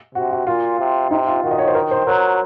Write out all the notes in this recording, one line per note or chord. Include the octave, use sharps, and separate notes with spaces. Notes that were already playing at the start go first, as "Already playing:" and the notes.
C3 F#4
F#4
A#2 F4
C3
C3 D#4
F4
D#3 F#4
D#5
C#5
C5
A#4
C5
F#3 A#4